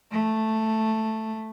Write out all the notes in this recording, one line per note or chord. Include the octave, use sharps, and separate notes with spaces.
A3